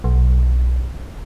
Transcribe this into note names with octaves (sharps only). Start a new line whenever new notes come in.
B1